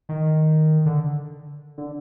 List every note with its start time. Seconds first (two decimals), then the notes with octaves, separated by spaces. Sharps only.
0.09 D#3
0.86 D3
1.78 D3